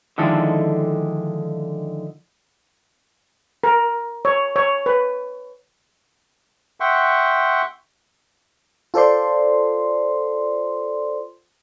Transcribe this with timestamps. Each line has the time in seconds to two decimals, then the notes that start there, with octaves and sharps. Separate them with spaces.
0.18 D3 D#3 F3 G#3 E4 A4
3.64 A#4
4.25 C#5
4.56 C#5
4.86 B4
6.80 E5 F#5 G5 C6 C#6
8.94 F4 A4 C5 D5 C6